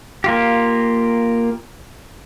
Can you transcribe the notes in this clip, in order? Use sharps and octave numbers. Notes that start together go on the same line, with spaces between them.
A#3 F4 G4